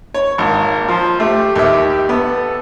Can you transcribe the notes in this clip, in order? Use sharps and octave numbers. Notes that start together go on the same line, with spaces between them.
C#5
G#1 A#3
F3 C5
A3 G4
D#2 G4 E5
B3 A4